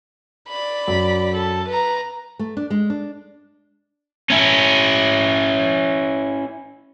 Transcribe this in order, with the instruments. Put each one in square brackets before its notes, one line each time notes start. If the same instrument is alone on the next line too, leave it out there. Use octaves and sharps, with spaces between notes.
[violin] D5 B5
[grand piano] F#2
[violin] A4
B4 A#5
[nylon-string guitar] A3
D4
G#3
D4
[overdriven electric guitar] C#4 E4